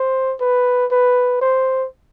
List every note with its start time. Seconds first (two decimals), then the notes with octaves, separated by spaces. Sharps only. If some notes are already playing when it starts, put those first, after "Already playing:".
Already playing: C5
0.41 B4
0.91 B4
1.41 C5